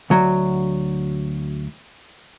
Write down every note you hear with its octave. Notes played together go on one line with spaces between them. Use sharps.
D2 F#3